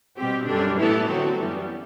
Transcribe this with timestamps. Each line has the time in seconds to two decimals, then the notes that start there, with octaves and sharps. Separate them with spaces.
0.17 B2 G3 C4 G4
0.47 F#2 D3 G3 D4
0.77 A2 E3 B3 E4 A4
1.07 D3 F#3 C4 F#4 A4
1.36 F#2 E3 G3 B3